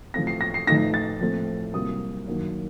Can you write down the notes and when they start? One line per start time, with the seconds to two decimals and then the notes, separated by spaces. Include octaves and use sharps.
0.14 A1 A2 F3 A3 C4 A#6
0.27 C7
0.41 A#6
0.54 C7
0.67 A1 A2 F3 A3 D#4 A#6
0.94 A6
1.20 A#1 A2 A3 C4
1.73 C2 C3 F#3 A#3 D#6
2.27 F#2 D#3 F#3 A#3 C#4